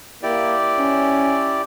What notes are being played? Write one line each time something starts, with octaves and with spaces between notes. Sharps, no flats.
A#3 E4 G4 D5
C#4